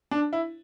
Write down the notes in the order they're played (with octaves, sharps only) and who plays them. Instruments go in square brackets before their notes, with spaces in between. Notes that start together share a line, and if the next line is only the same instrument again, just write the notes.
[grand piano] D4
E4